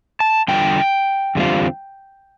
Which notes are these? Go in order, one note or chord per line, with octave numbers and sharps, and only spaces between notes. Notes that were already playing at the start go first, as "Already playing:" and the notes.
A5
E2 D3 G3 F4 G5
E2 D3 G3 C4 F4